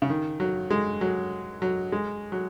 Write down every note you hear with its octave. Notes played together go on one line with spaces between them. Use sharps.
C#3
D#3
F#3
G#3
F#3
F#3
G#3
F#3